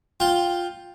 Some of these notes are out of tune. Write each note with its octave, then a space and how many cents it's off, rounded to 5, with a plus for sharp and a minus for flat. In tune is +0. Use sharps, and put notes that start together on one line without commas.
F4 +5 G5 +0